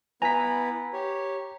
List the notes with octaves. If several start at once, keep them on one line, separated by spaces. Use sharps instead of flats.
B3 E4 B4 G#5 A#5 B6
G4 C#5